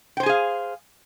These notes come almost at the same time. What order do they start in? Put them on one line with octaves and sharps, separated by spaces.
G5 C5 G#5 G#4 F5